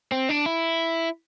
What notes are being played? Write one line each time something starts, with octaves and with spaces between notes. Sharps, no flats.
C4
D4
E4